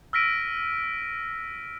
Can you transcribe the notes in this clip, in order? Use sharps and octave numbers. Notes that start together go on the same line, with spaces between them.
E6 F6 A#6 B6 D7 D#7